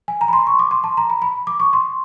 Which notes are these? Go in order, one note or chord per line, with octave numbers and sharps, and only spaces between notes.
G#5
A#5
B5
C6
C#6
D6
C6
A5
A#5
B5
B5
D6
C#6
C6